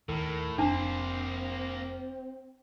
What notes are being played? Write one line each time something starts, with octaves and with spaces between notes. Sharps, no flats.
D#2 A2 A#4
F1 A#3 C4 D4 C5 A5